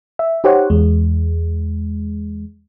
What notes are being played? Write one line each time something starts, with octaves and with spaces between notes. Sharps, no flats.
E5
D#4 G4 C5 C#5 F#5
E2 G#3